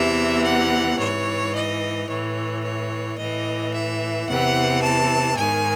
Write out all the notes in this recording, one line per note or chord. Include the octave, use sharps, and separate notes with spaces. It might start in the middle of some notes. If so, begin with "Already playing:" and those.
Already playing: E2 C3 E3 E5
F#5
G#2 E3 C#5
D#5
A2 E3 C#5
C#5
A2 E3 D#5
E5
E2 C3 E3 F#5
A5
G#2 D#3 G#5